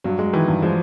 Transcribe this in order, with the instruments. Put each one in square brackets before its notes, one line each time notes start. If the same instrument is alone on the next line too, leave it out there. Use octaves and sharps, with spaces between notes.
[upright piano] G2 [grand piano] F#3
[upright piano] G#3
[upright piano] D#3 [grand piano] E3
[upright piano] G2
[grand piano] F3 [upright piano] G#3